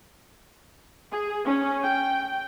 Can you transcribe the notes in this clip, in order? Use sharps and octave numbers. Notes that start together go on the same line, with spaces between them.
G#4
C#4
G5